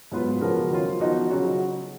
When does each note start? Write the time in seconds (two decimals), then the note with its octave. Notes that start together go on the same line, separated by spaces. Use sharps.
0.12 G#2 F#3 B3 F4 B4
0.41 C#3 F3 B3 F#4 A#4
0.71 D#3 F#3 C#4 F4
1.00 F3 B3 D#4 F#4
1.30 C#3 F#3 C#4 F#4